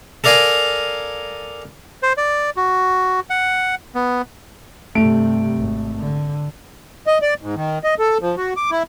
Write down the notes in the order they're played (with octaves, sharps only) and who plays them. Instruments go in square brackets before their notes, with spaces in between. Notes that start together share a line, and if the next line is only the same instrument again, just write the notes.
[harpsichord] A4 A#4 D5 F5 G#5 A#5
[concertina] C5
D5
F#4
F#5
B3
[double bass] G2 C3 [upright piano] A3 D7
[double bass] G#1
D3
[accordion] D#5
D5
G#2
D#3
D#5
A4
F3
F#4
D6
E4